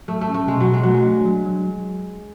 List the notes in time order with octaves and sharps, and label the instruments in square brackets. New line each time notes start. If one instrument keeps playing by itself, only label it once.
[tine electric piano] F#3 [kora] A3
[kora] A3
[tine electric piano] C#4
[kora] A3
[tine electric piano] B2 [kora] G#3
[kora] F#3
[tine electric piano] F#4
[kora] G#3
[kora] F#3 [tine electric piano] A3
[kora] G#3
[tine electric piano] D4
F#3
F#3